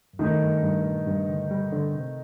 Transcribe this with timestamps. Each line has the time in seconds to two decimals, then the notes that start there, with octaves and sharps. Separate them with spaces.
0.13 F#2
0.19 G2 D#3 A3 D#4
0.41 G2
0.63 G2
0.85 A#2
1.07 G2
1.28 D3
1.51 G3
1.73 D3
1.95 C3